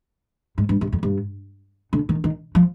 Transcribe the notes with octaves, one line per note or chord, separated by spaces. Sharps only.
G#2
G2
G2
F2
G2
D3
D#3
D#3
F3